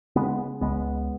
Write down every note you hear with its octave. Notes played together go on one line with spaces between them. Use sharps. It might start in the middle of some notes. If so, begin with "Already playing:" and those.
C#3 G#3 B3
C#2 G#3 B3